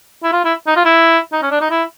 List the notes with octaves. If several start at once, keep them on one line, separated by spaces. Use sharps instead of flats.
E4
F4
E4
D#4
F4
E4
D#4
C#4
D4
D#4
E4